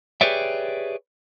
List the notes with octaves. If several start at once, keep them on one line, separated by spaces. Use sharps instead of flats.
G4 G#4 B4 C#5 D5 E5